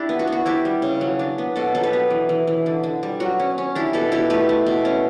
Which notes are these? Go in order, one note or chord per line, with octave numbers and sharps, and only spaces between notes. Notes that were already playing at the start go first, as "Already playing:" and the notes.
Already playing: D4 E4 G4
B3
F#4
B3
F#4
D4 E4 G4
G3
C#3
F#3
D4
B3
B2 F#4 A4
F#3 A4
G4 B4
B3
E3
E3
E3
D3
D3
G3
F#3 F#4
C#4
C#4
D4 E4 G4
B2 F#4 A4
B2 E4 G4
A3 G4 B4
A3
B2
C#4